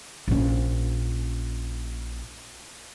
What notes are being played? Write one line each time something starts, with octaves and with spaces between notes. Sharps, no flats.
A#1 C#4